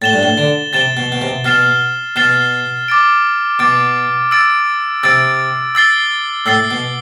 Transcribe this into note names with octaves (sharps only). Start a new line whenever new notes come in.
A2 A6 E7 G7
G2
A2
D3
C3 A6 E7 G7
B2
B2
C3
B2 F6 A6 C7 E7 G7
B2 F6 A6 C7 E7 G7
D6 A6 D7
B2 D6 A6 D7
E6 A6 D7
C3 E6 A6 D7
E6 A6 C7 G7
A2 E6 A6 C7 G7
B2